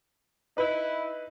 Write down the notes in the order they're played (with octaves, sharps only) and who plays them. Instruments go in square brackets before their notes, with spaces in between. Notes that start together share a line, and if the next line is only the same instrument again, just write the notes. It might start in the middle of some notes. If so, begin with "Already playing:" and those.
[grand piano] D#4 B4 [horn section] E4